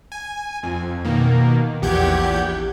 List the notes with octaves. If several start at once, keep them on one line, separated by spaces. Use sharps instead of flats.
G#5
F2
B2 D#3 A#3
A#1 E2 G4 F#5 G6 G#6